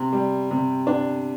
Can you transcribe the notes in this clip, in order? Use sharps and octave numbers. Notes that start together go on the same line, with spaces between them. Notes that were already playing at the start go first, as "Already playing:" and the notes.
Already playing: C3
G3
C3
D4